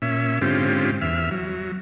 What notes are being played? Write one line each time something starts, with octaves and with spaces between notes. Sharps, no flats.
A#2 C#4 E5
G#2 D3 C4 C#4 F4 G4
E2 E5 F6
F#3